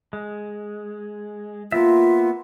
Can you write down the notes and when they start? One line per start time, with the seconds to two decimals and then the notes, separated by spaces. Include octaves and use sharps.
0.13 G#3
1.72 A#3 B3 F4 E5